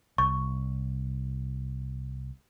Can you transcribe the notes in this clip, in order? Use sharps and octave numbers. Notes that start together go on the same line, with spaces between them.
C2 C#6